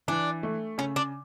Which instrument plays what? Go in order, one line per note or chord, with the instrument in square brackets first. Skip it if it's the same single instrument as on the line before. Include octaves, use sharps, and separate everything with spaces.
[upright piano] E3 [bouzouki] D4
[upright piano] A3
[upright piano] C#3 [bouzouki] C#4
[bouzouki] D4